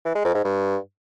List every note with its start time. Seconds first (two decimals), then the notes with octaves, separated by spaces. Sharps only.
0.05 E3
0.15 G#3
0.25 F2
0.35 G#2
0.45 G2